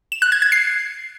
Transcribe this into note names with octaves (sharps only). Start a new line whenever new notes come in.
E7
F#6
G#6
G#6
C7